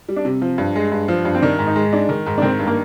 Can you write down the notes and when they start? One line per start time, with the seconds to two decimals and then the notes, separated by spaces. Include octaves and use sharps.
0.09 G3
0.16 D4
0.25 C3
0.42 F3
0.58 G2
0.76 G#3
0.92 G2
1.08 F3
1.25 G2
1.35 C4
1.42 D#3 D4
1.59 G#2
1.66 D#4
1.76 G#3
1.92 D4 D#4
2.09 D#3
2.26 G#2
2.38 D4
2.42 D#3 C4
2.59 G2
2.67 A#3